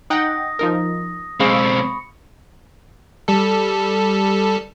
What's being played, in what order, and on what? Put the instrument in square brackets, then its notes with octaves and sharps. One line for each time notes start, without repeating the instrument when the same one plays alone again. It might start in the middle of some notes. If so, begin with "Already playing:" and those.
[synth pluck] D#4 F#5 G5 [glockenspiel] D#6 A#6
[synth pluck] F3 D#4 A#4
[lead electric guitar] B1 C4 [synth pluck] G#3 F5 [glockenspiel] B5 C#6 C#7
[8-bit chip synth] G3 A4